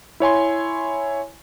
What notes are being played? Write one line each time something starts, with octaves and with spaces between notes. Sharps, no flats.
E4 C#5 G#5 C6